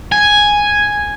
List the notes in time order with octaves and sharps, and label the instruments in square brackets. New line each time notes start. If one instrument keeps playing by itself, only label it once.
[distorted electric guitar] G#5